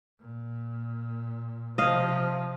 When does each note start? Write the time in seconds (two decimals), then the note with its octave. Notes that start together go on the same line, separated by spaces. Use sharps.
0.21 A#2
1.78 C3 F3 D#5 F5